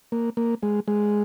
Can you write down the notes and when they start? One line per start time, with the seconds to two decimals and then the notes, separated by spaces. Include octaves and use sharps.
0.12 A#3
0.37 A#3
0.63 G#3
0.88 G#3